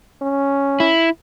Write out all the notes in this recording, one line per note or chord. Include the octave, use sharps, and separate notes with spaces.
C#4
E4